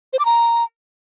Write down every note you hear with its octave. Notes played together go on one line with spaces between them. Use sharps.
C5
D6
A#5